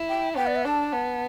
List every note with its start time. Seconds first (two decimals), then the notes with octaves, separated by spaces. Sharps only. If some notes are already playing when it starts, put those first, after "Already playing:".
Already playing: E4
0.09 G5
0.37 B3 G5
0.47 D5
0.56 E5
0.65 D4 A5
0.93 B3